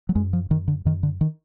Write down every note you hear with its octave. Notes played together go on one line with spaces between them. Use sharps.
F#3
F#2 G#3
F3
F#2 D#3
D3
F#2 D#3
D3
D#3